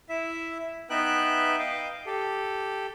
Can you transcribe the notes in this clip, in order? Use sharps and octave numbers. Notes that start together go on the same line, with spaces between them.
E4 E5
B3 D#4 B4 E5 G5 F#6
D#5 F5 G5
G4 A4